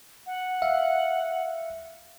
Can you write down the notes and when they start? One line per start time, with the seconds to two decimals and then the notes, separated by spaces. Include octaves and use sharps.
0.26 F#5
0.62 E5 F5